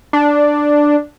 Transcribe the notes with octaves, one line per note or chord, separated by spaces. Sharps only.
D4